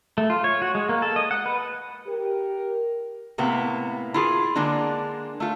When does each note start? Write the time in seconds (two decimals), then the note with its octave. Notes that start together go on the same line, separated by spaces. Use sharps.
0.18 A3
0.30 F4
0.44 C#5
0.62 F#4
0.75 G#3
0.89 A#3
1.02 A4
1.16 D#5
1.31 F#5
1.46 B4
2.07 G4 A#4
3.38 A2 C3 A#3 B3
4.14 E4 F4 G#4
4.56 D3 G#3 A#3 D4
5.40 A3 F4